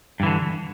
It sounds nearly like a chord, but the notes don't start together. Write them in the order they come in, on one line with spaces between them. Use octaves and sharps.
G2 E3 D3